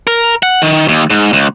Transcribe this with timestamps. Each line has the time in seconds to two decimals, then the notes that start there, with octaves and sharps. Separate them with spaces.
0.07 A#4
0.43 F#5
0.62 D#3
0.88 D#2
1.10 G#2
1.33 C#2